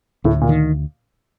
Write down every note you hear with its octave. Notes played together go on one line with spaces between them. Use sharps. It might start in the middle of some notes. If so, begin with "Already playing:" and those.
D2 A2
A#2
D#3